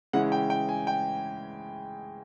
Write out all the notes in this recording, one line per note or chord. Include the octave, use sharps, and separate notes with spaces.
C#3 E3 G#3 C#4 E4 F#5
G5
G5
G#5
G5